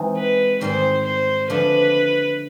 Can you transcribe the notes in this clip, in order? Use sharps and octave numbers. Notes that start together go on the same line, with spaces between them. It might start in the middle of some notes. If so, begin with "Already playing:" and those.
Already playing: E3 G#3 C4 D#4
B4
G#2 D#3 G3 C4 C5
C5
D3 F3 A3 D4 B4